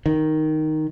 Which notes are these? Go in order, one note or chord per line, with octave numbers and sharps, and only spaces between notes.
D#3